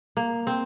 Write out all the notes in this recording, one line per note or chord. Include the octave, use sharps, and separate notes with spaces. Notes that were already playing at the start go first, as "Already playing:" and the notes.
A#3
C4